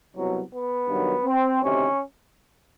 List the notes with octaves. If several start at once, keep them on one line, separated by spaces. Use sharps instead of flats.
C2 B2 F#3
B3
G2 D#3 F#3
C4
D2 C3 D#3 C#4